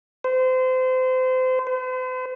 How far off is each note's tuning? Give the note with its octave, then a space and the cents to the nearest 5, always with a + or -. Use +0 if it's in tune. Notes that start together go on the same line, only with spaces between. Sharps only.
C5 -30
C5 -45